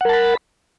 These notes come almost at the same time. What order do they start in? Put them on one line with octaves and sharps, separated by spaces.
F#5 A#4 A5 B5